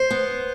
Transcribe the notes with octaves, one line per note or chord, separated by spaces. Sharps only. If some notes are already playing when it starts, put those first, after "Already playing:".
Already playing: C5
B3